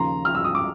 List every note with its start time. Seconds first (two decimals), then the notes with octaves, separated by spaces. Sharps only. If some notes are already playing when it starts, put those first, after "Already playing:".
Already playing: D#2 C#3 F3 A#5 C6
0.25 F6
0.35 E6
0.44 D#6
0.55 D6